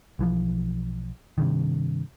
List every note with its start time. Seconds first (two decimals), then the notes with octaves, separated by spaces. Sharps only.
0.19 B1 E3 F3
1.38 G2 C3 D#3